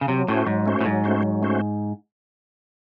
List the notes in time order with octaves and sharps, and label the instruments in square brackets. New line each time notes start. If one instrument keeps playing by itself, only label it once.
[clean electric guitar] C#3
[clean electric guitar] C3 [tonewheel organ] F#3
[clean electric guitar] A2 [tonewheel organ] A3 C#4 F#4 C5
[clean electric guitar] G#2 [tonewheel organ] F#3
[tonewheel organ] A3 C#4 F#4 C5
[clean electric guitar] A2
[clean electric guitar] G#2 [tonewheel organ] F#3
[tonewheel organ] A3 C#4 F#4 C5
F#3
A3 C#4 F#4 C5